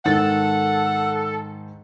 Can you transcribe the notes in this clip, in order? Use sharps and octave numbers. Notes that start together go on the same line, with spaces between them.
G#2 D#3 A4 F#5 A6